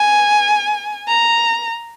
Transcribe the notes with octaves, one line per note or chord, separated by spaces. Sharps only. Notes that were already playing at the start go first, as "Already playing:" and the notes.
Already playing: G#5
A#5